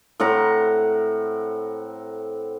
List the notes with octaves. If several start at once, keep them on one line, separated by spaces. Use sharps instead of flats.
A2 C4 F#5 A#5